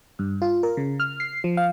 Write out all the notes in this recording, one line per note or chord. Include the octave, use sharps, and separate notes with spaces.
G2
F4
A#4
C#3
F6
C7
F3
F5